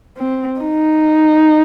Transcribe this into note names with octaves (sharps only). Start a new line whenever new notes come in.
C4
D#4